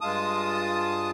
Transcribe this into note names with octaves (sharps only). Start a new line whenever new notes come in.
G2 G#3 F4 A5 D#6